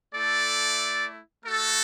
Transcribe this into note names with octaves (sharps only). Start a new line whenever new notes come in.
A3 E4 A4 D5
A3 F#4 A4